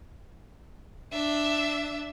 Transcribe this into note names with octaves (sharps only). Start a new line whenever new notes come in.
D4 E5